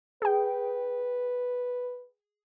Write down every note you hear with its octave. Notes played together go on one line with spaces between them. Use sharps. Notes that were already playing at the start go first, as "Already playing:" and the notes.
G#4 B4 G5